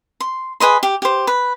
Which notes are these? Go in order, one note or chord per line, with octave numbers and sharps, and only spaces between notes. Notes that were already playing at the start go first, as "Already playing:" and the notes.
C6
G#4 B4 D#5 C6
G4
G4 C5
B4